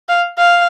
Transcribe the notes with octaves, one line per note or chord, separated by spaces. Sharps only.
F5
F5